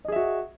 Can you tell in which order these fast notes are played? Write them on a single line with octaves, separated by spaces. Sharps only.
D#5 G#4 E5 F#4